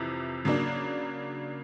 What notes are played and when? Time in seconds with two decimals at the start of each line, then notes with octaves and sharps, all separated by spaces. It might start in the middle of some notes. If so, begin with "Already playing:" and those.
Already playing: F2 C3 E3
0.45 C#3 F#3 A#3 D4